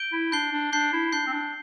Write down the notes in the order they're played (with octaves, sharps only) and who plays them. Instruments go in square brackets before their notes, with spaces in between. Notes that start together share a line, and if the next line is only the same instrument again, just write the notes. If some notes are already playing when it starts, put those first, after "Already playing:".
Already playing: [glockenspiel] G6 D7 G7
[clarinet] E4
[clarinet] D4 [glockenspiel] G6 C7 G7
[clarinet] D4
[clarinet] D4 [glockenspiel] G6 C7 G7
[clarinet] E4
[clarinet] D4 [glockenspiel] G6 C7 G7
[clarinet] C4
D4